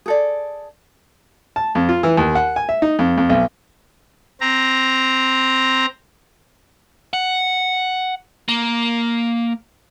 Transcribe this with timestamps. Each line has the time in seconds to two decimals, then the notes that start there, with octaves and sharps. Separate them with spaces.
0.06 G#4 A4 D5
1.56 A5
1.75 F2
1.89 F4
2.03 E3
2.18 D#2
2.35 F#5
2.56 G#5
2.69 E5
2.82 D#4
2.99 F2
3.17 F2
3.29 B1
4.41 C4 A#5
7.13 F#5
8.48 A#3